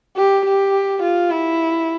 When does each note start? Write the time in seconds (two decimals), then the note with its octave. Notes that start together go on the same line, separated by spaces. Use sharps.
0.17 G4
0.46 G4
1.03 F4
1.30 E4